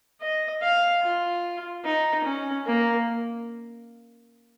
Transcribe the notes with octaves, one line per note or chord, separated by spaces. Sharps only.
D#5
F5
F4
D#4
C#4
A#3